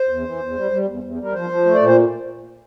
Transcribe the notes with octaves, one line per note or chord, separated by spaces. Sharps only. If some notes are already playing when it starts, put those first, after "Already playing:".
Already playing: C5
E2
E3
E2
G3
G3
E2
E2
G3 A#4
F3 C5
F3
A3
D5
A#2 C5